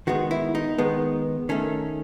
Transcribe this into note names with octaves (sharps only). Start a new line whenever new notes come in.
D#3 G#3 B3 F#4
E4
D#4
D#3 G#3 B3
D#3 A3 C#4